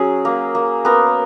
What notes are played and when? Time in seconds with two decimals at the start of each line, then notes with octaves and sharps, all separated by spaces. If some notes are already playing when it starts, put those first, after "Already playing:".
Already playing: F#3 C#4 G#4
0.25 A#3
0.55 A#3
0.85 B3 A#4